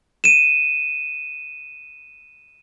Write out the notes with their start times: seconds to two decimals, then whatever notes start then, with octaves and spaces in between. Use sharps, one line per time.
0.24 D#7 E7